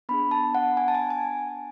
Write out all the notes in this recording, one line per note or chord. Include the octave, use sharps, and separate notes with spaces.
B3 D4 G#4 B5
A5
F#5
G#5
A5
G#5
G#5